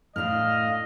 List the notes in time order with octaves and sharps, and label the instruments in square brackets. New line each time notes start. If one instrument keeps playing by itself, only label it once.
[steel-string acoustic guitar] A2 D4 [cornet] D#5 [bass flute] F5 [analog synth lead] F6